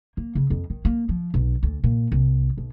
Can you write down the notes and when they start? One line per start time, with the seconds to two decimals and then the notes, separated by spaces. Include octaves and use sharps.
0.17 A#3
0.35 C#3
0.50 F2
0.70 D#3
0.85 A#3
1.09 F3
1.34 B1
1.63 D2
1.84 A#2
2.12 C2
2.58 B1